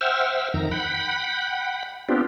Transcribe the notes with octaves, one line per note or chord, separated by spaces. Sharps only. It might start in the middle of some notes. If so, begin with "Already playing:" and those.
C5 E5 F#5 G5 E6 F6
F2 D#3 A#5
F#5 G5 B5
B3 C4 D4 F4 G4